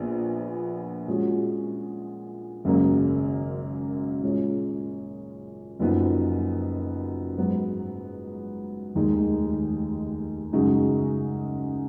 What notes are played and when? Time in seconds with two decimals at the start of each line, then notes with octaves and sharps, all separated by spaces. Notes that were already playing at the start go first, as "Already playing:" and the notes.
Already playing: A#1 A#2 F3 B3
1.08 A#2 G#3 C#4 F#4
2.65 G#1 F#2 C#3 F#3 A#3
4.22 A#2 G#3 C#4
5.80 F#1 F#2 F3 B3 D#4
7.38 G#2 F#3 B3
8.95 F1 D#2 D#3 G#3 D#4
10.53 F#2 C#3 G#3 D#4 F#4